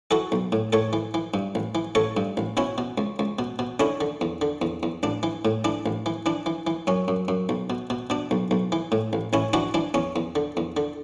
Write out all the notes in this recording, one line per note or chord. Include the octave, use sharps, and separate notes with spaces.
E3 F#4 A4
B1
A2
A2 A4 C#5
E3
E3
G2
A1
E3
A1 A4 C#5
G2
A1
B2 C#4 E4
B2
C#2
C#2
B2
B2
D3 C#4 E4
D3
E2
D3
E2
E2
A1 D4
E3
A2
E3 D4
A1
E3
E3 D4
E3
E3
F#2 C#4
F#2
F#2
B1
B2
B2
B2 D4
B1
B1
E3
A2
A1
A1 C#4 E4
E3 D4 F#4
E3 D4
E2 C#4
E2
D3
E2
D3